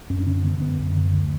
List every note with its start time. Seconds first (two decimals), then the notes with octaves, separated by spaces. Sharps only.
0.10 F#2 C#4
0.20 D4
0.27 D3 C#4
0.44 D3 B3
0.61 F#2 B3
0.79 F#2
0.96 D3
1.14 D2